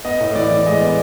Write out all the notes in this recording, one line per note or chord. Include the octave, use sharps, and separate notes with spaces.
B3 D#5
A2
E3 D5
E3
G#3 D#5
B3 D5